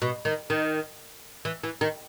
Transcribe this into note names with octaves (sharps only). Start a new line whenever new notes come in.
B2
D#3
D#3
E3
E3
D#3